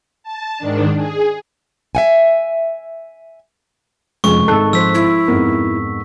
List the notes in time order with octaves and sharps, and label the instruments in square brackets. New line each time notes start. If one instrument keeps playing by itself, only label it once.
[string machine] A5
G#2 D#3 D4
G#4
[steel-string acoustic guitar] E5 F#5 G#5
[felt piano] F1 F#2 F3 [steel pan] G#3 [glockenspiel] C#6
[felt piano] G#1 D#3 F#6 [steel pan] A4
[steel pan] F3 C5 [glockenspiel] E6 B6
[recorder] E4
[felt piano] F2 G#2 B3 [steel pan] A#4